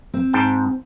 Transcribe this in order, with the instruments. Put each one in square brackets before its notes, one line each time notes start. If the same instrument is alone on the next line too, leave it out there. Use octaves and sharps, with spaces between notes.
[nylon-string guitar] C4
[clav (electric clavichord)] G#2 G5 A5